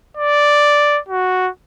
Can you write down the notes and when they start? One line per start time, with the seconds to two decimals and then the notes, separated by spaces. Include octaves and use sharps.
0.17 D5
1.08 F#4